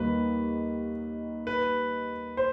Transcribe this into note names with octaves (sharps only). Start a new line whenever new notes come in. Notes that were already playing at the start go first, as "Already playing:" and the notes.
Already playing: D#2 D#3 G3 A#3 B4
B4
C5